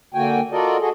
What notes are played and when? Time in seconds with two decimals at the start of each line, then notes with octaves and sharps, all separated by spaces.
0.14 D3 A#3 F#4 G5 G#5
0.51 F4 F#4 A4 A#4 D5 D#5
0.80 F#4 G#4 A4 D#5